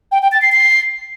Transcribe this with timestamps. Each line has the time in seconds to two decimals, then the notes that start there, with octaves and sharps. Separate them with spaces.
0.12 G5
0.22 G5
0.32 A6
0.42 C7
0.52 C7